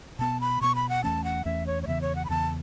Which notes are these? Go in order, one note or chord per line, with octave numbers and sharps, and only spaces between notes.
B2 B3 A5
B5
B2 B3 C#6
B5
F#5
E2 E3 A3 C#4 A5
F#5
E2 E3 A3 C#4 E5
C#5
C#5
E2 C#3 E3 B3 E5
C#5
F#5
B5
E2 C#3 E3 B3 A5